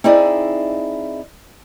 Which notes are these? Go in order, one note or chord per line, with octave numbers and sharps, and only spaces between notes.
C4 D#4 E4 G#4 D5 D#5